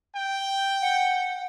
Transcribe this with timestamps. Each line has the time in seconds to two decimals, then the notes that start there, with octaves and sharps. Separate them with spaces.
0.16 G5
0.82 F#5